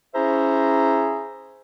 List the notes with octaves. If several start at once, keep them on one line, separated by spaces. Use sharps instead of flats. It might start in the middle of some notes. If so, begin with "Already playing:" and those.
C#4 E4 G#4 C5 E5 A#5